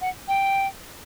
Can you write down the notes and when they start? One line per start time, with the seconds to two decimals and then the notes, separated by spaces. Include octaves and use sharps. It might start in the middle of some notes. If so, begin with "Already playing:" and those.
0.01 F#5
0.28 G5